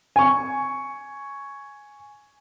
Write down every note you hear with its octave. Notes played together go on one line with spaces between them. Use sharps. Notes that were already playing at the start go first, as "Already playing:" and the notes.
G#5 C#6